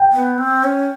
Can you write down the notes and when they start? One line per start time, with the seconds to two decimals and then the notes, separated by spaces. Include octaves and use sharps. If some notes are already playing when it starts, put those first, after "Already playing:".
Already playing: G5
0.12 B3
0.38 C4
0.64 C#4